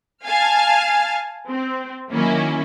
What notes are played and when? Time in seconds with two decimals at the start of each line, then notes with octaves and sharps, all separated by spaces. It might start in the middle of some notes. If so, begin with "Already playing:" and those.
0.25 F5 G#5 A5 F6
1.50 C4
2.11 D#3 F#3 A#3 C#4 E4